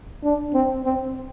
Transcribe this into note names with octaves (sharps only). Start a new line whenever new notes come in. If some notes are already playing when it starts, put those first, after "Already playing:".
D4
C4
C4